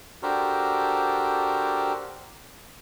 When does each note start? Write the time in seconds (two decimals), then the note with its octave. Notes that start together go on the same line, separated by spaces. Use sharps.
0.23 D4 F#4 G4 A4 A#4 C5